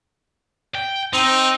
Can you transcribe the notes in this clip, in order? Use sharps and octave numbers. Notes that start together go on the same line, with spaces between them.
G5
C4 D#4